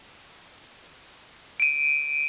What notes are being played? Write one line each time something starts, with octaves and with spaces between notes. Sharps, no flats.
D7 D#7